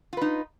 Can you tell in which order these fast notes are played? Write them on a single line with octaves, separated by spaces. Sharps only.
F4 B4 D#4